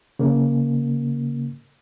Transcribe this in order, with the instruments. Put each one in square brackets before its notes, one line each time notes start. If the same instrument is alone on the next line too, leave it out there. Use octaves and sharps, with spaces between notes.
[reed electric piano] C#3 A#3